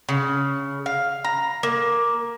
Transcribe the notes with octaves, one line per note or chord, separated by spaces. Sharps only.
C#3
F5
A#5
A#3